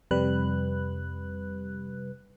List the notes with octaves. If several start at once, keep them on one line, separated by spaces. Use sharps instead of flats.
F2 C3 G3 B4 F#6